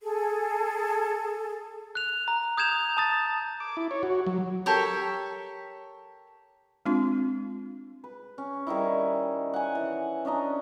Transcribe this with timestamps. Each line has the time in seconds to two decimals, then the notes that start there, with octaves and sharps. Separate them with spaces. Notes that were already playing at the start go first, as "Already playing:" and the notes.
0.01 G#4 A4
1.95 F#6 F7
2.28 A#5
2.57 D#6 G6 G#6 E7 F7
2.97 A5 D#6 A6
3.60 D6
3.77 E4
3.91 C#5
4.03 F#4
4.27 F#3
4.66 G4 A4 A#4 C#5
6.86 G#3 C4 D4 F4
8.04 B4
8.38 C#4
8.67 D#3 G3 D#4 E4
9.54 F#5 G#5
9.75 E3
10.25 C#4 D4 D#5 A#5